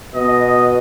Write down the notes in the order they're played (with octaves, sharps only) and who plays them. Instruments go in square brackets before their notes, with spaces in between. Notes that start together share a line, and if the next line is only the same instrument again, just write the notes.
[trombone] B2 [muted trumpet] D#5